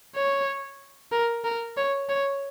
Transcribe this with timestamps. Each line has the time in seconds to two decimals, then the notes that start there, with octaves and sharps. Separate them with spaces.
0.16 C#5
1.12 A#4
1.44 A#4
1.77 C#5
2.09 C#5